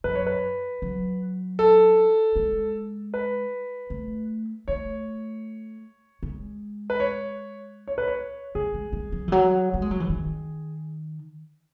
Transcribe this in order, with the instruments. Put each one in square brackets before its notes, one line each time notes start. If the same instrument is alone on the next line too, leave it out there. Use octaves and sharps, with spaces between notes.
[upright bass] F#2 [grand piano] B4
[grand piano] C#5
B4
[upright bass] F#3
[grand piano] A4
[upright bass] G#3
[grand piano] B4
[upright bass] A3
[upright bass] A3 [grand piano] C#5
[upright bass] G#3
[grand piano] B4
C#5
C#5
B4
C#5
[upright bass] G#3 [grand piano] G#4
[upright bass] G#3
G#3
F#3
E3
F#3
A3
G#3
F#3
E3
D#3